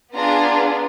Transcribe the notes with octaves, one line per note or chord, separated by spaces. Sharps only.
B3 D4 F4 G#4 A#5